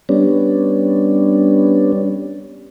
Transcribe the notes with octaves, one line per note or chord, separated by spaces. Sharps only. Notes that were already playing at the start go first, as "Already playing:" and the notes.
G3 B3 C#4 D4